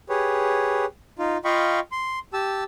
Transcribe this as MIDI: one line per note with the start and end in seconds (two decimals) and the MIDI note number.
0.09 0.85 67
0.09 0.85 68
0.09 0.85 71
0.09 0.85 73
1.19 1.37 63
1.19 1.37 65
1.45 1.80 65
1.45 1.80 75
1.45 1.80 77
1.45 1.80 79
1.45 1.80 83
1.45 1.80 85
1.92 2.19 84
2.33 2.64 67
2.33 2.64 81
2.33 2.64 88